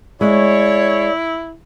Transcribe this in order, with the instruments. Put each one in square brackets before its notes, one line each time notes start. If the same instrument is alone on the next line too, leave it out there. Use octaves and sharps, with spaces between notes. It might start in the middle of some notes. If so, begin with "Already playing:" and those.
[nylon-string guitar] G#3 [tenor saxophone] E4 [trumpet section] C#5 [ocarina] D5